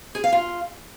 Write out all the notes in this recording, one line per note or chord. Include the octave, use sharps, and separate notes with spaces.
G#4
F5
F4